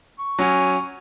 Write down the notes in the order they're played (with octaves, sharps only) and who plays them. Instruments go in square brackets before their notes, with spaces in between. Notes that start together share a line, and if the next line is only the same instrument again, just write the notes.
[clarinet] C#6
[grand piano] F#3 C#4 [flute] G#5